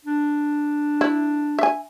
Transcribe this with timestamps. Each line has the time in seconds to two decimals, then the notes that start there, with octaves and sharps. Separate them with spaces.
0.05 D4
1.01 E4
1.59 E5 G#5